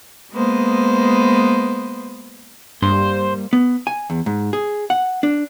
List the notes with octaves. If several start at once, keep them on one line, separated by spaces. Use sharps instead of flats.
G#3 A#3 B3 B4 C5
G2 G3 A#3 C5
B3
G#5
E2
G#2
G#4
F#5
D4